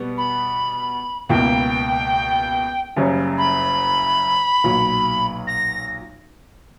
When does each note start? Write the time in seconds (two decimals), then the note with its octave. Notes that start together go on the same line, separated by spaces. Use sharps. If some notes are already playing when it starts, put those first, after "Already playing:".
Already playing: B2 G3 B3
0.18 B5
1.29 C#2 B2 A#3 E4 G5
2.96 F#1 F#2 C#3 G3 C#4
3.38 B5
4.64 B1 A#2 F#3
5.47 A#6